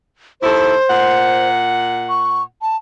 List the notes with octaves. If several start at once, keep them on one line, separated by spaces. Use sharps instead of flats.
D#2 E4 A4 C5
A#2 F#5
C#6
A5